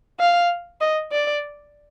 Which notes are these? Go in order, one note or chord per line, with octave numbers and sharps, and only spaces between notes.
F5
D#5
D5